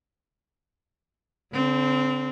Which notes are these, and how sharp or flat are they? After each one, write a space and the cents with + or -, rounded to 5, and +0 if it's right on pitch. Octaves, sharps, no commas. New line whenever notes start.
D3 -45 C4 -20